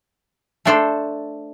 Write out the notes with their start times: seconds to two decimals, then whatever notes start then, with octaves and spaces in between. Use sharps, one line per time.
0.65 A3 D4 A4 C5